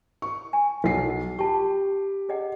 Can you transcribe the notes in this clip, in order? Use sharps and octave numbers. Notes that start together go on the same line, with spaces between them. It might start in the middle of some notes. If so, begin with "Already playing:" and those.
C#6
G#5
B1 F5 F#5 C7
F4 G4 A5 C#6
G#4 D#5 F#5